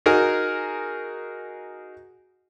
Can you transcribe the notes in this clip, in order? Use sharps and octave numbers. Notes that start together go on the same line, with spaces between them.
D#4 F#4 G#4 A#4